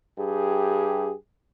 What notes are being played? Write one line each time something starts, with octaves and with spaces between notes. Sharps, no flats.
G2 G4 G#4